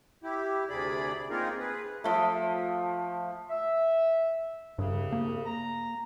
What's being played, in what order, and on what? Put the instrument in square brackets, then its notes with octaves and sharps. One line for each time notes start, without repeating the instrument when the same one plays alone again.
[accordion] E4 G4
D2 C3 G#4 D5 B5
A#3 C4 D#4 F4 G#4 A#4
G#4 B4
[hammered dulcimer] F3 A3
[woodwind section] E5
[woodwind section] C2 C#3 [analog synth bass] G2
[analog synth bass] A#3
[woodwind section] A#5